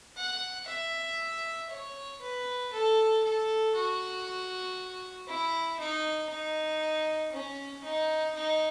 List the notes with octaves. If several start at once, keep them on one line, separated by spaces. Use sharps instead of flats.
F#5
E5
C#5
B4
A4
A4
F#4
E4
D#4
D#4
C#4
D#4
D#4